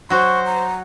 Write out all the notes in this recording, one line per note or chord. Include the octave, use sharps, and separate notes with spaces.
F#3 F#4 C5 C#6
A#5